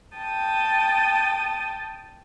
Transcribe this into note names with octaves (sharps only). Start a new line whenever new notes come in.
G5 A5 D#6